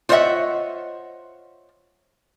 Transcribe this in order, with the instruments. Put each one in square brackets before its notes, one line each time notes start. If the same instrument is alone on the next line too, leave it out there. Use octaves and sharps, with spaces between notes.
[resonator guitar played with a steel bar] F4 C5 C#5 D#5 E5 F#5